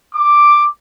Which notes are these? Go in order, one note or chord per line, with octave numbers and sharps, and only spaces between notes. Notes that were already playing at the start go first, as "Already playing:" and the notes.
D6